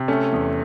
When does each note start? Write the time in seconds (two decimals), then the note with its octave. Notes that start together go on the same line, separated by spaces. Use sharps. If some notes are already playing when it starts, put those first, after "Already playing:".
Already playing: C3
0.08 A3 C#4
0.32 E2